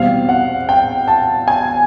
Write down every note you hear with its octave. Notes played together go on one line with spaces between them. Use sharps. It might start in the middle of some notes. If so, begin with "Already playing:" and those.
Already playing: E2 B2 G3 C4 F5
F#5
G5
A5
G#5